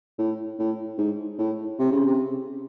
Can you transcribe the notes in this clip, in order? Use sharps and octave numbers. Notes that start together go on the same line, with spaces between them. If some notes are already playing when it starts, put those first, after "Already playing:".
A2
A2
G#2
A2
C3
C#3
C3